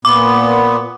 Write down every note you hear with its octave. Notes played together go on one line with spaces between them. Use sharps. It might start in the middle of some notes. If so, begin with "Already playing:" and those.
A#2 B3 D6